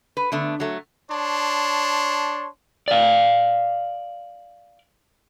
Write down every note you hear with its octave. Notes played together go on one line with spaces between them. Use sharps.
B4
D3 A3 B3
F#3 A3
D4 C#5 A5 C6
D5 F5